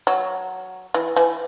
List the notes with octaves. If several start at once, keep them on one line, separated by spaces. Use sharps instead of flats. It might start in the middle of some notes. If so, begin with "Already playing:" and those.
F#3
E3
E3